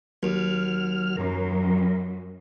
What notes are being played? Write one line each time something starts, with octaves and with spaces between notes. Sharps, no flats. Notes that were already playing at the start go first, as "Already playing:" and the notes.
D#2 F#3 F6
F#2 A#4